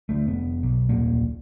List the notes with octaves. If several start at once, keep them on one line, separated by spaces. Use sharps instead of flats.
D2 A3
F1 B3
B1
D#1 C2 A#2 A#3